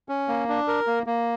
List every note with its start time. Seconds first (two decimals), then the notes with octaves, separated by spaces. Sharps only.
0.09 C#4
0.28 A#3
0.48 D4
0.68 A#4
0.87 A#3
1.06 A#3